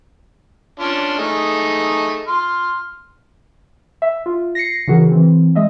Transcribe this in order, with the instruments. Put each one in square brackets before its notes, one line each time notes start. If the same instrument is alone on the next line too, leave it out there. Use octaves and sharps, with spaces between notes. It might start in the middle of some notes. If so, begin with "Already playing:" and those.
[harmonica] C#4 D4 F4
A3 D#4 G#4
C6 F6
[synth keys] E5
F4
A#6 C7 C#7
C#3 E3 F#4 G#4 A#4
E3 C4
G#3 D#5 E5